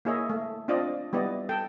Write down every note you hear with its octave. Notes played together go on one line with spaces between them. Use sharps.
A#3 E4 G#4 C#5 D#5 E5
A3
C4 D4 F4 D5 D#5
G3 B3 E4 D5 D#5
A4 G5 A5